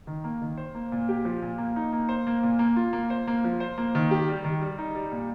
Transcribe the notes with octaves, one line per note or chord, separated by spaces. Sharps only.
D#3
A#3
D#3
C5
A#3
A#2
G4
F3
A#2
A#3
D#4
A#3
C5
A#3
A#2
A#3
F4
A#3
C5
A#3
F3
C5
A#3
D#3
G4
G3
D#3
G3
D#4
G3
A#2